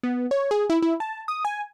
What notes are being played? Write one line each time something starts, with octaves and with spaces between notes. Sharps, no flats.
B3
C#5
G#4
E4
E4
A5
D#6
G#5